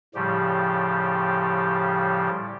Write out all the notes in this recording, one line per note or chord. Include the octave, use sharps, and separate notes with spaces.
A2 C#3 F3 G3 G4